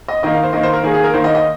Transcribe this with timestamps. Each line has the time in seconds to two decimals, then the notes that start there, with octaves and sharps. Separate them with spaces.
0.08 D#5
0.23 D#3 A#3 D#5
0.34 F5
0.44 C5
0.53 D#3 A#3 D#5
0.63 C5
0.73 A#4
0.83 D#3 A#3 G#4
0.94 G#4
1.04 A#4
1.14 D#3 A#3 C5
1.24 D#5
1.35 D#5